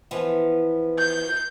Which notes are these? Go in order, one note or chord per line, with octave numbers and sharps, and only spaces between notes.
E3 F3 B3
G6